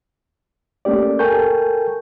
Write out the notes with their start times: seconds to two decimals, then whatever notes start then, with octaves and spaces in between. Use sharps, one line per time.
0.85 A3 A#3 C#4 G4 D5
1.19 A4 A#4 G5 G#5 C#6 G6